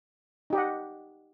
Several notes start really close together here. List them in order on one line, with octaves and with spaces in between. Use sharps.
D#4 G4 D#5 F#5